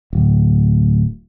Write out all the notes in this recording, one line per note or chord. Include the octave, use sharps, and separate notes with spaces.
D1